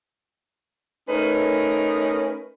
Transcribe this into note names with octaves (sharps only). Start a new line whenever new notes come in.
A3 C#4 D#4 A#4 B4